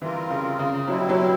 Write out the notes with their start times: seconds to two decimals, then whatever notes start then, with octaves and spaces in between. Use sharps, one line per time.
0.01 E3 G3 C4 F4 A#4
0.30 C#3
0.59 C#3
0.87 B2 F#3 G3 C4 E4
1.09 F#3